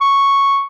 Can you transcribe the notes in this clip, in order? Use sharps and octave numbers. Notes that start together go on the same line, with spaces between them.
C#6